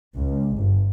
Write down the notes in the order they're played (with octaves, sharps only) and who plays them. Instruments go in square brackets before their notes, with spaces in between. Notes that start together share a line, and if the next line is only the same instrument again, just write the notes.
[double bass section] C#2
G1